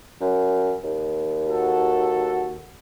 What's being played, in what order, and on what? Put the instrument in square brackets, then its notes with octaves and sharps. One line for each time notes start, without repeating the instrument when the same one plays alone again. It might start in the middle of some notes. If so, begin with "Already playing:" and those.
[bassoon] F#2
D#2
[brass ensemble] F#4 A4